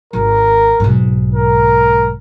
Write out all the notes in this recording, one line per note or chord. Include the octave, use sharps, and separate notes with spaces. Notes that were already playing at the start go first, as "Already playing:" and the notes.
G#1 A#4
B1 G#2
A#4